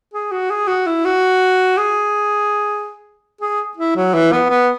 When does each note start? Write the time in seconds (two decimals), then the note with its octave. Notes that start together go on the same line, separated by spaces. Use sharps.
0.14 G#4
0.31 F#4
0.50 G#4
0.67 F#4
0.86 E4
1.05 F#4
1.77 G#4
3.41 G#4
3.77 E4
3.96 F#3
4.14 E3
4.32 B3
4.49 B3